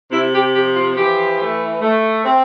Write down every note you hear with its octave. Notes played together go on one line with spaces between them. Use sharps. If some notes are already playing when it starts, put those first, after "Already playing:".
C3 E4
G4
F3 G4
F4
E3 G4
A3
A3
C4